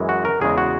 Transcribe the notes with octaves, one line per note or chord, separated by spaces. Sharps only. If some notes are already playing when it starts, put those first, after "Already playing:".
Already playing: F#2 E3 G#3
F#4
A#4
E2 C#3 G#3 G#4
F#4